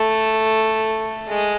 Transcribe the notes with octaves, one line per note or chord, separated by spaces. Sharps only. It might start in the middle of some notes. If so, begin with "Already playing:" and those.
Already playing: A3
G#3